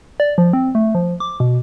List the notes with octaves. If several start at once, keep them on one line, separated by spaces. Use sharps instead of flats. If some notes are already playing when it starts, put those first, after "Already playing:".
D5
F3
C4
A3
F3
D6
B2